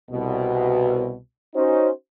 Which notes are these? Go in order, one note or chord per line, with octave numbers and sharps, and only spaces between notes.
C2 B2
C#4 D#4 F#4 C5